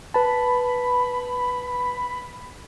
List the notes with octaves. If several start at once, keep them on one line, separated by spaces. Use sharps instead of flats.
B4 A5 B5